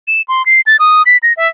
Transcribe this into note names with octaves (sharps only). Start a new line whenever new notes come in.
E7
C6
C7
A6
D#6
B6
A#6
E5